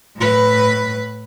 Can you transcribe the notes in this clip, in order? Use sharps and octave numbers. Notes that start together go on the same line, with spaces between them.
A2 B4